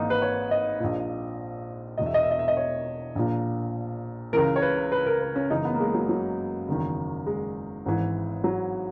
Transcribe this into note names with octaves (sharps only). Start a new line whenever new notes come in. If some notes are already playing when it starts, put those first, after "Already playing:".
Already playing: G#1 G#2 E3 A#3 D#4
B4
C#5
D#5
A#1 A#2
E1 E2 B2 D#5
E5
D#5
E5
D#5
E5
D#5
C#5
A#1 A#2
C#2 C#3 E3 A#4
C#5
B4
B4
A#4
B4
C#4
F#1 F#2 C#3 E3 D#4
B3
A#3
G#3
F#3
F#3
F#1 E2 D#3
G#3
G#1 G#2 E3
F#3